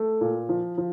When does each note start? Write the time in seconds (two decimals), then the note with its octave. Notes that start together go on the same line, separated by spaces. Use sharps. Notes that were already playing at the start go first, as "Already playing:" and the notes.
Already playing: A3
0.21 A#2
0.49 F3
0.78 F3